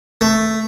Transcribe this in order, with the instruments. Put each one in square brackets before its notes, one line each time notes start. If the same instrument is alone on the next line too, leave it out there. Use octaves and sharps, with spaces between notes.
[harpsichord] A3